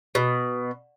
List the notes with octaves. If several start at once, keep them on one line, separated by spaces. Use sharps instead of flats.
B2